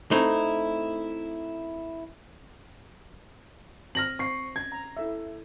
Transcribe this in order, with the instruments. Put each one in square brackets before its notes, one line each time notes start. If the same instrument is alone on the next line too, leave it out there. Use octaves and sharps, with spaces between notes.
[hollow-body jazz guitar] A3 C4 D#4 E4
[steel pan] C4 [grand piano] F6 A#6 F#7
[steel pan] C4 [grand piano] C#6 C7
[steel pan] C#4 [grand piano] G#6
[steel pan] A#5
E4 A4 E5